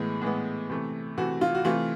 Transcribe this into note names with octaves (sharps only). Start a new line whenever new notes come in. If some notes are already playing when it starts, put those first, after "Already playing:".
Already playing: A2 E3 G#3 B3
A2 E3 G#3 B3
C3 E3 A3
C3 E3 A3 F#4
F4
F#4
C3 E3 A3 F4